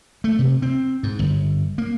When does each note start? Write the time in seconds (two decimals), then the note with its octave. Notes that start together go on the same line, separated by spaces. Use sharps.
0.24 A3
0.39 C3
0.62 C4
1.03 G#2
1.19 G1
1.78 A#3